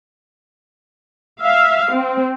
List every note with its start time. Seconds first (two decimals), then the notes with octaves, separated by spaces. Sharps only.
1.40 E5 F5
1.91 C4